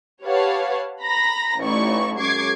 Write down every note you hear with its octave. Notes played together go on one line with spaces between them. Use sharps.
G4 B4 C#5 F5 F#5 A5
A#5 B5 A#6
A1 A3 D#4 E4 D5 C#6
F#2 G#3 C#6 D6 G#6 C7